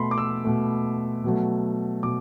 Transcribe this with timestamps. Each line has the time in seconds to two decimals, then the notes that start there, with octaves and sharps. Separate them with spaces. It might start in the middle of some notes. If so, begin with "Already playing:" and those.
Already playing: B2 A3 B5 C6
0.11 D6
0.18 E6
0.45 B2 A3
1.24 B2 F#3 A3
2.03 B2 D6